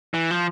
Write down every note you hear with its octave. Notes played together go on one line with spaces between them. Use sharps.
E3
F3